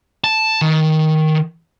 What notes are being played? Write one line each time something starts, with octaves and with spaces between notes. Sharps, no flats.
A5
D#3